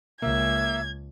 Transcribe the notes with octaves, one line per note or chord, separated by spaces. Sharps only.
C#2 A#3 E5 G#6